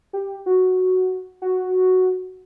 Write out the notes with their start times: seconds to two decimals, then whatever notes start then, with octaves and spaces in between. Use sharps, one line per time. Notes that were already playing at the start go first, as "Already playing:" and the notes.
0.13 G4
0.46 F#4
1.42 F#4